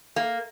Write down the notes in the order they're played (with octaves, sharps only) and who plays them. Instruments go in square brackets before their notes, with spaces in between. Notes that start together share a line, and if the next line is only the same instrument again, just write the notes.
[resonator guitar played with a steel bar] A#3